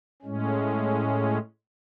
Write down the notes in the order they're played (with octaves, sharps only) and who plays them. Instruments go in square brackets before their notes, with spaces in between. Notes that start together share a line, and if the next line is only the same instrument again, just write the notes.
[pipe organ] A2 G#3 C#4